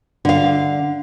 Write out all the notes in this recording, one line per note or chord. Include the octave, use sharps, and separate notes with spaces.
D3 F5